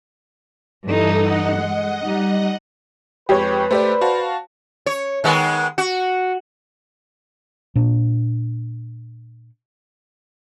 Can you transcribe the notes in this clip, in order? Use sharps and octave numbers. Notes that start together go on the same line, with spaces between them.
G2 E3 D#4 A4 D#6
D#5 F#5
G#3
G3 D#4
F2 G#3 G4 B4 C#5
A3 G4 C5 D5
F#4 F5 A5
C#5
D#3 G#3 B3
F#4
A#2 D4